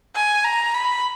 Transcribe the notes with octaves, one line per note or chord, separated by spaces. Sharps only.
G#5
A#5
B5